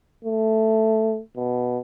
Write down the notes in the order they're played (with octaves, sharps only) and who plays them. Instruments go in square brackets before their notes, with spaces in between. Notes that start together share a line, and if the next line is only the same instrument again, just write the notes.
[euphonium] A3
B2